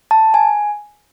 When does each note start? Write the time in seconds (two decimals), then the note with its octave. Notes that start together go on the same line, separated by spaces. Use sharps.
0.11 A5
0.34 G#5